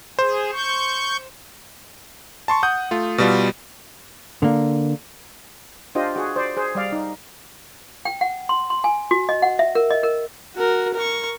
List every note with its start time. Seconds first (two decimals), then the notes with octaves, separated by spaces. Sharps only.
0.19 G#4 C5
0.53 C#6 G6
2.48 A5 C6 C#6
2.63 F#5 D#6 G6
2.91 A3 F4
3.18 B2 G3 F4
4.42 D3 A#3
5.95 D4 F4 G4 C5 D#5
6.16 F#4 G#4
6.36 C5 D5
6.57 G#4 C5
6.75 G3 D5 F5
6.92 D#4
8.05 G5
8.21 F#5
8.49 C6
8.70 C6
8.84 G#5
9.11 F#4
9.29 D#5
9.42 F#5
9.59 E5
9.75 A#4
9.90 D#5
10.03 A#4
10.55 F#4 A#4
10.94 A#4 C#6